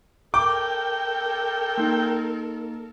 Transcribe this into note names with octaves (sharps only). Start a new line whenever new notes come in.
A4 A#4 G5 D6
A#3 D#4